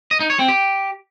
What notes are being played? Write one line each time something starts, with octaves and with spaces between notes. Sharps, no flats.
D#5
D#4
C#5
C4
G4